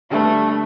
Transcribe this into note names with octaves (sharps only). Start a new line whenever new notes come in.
D3 G3 A3 D4 B4